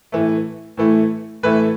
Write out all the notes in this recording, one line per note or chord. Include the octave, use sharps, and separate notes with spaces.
A2 E3 A3
A2 E3 A3
A2 E3 A3 B4